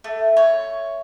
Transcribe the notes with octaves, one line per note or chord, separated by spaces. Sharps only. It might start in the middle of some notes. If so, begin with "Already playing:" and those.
A3
C#5